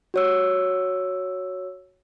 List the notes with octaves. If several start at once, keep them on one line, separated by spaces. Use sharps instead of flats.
F#4 C#5 E6